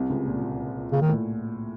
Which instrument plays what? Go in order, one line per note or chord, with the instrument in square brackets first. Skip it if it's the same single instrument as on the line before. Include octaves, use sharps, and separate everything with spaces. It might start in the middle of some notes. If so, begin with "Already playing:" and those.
Already playing: [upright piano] C2 C3
C#2 C#3
A#2
A#2
[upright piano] A#2 [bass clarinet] C#3
[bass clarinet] D#3
[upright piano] A2